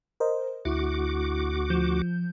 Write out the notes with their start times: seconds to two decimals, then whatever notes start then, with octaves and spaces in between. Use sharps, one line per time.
0.20 A#4 C5 D#5
0.65 D2 E4 F#4 D6
1.70 F3 G6